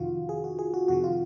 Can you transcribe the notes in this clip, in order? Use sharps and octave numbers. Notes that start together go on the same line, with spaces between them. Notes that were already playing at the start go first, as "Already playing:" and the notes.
Already playing: F2 C3 D#3 F4 F#4
G#4
F#4
G#4
F#4
F2 C3 D#3 F#4
F4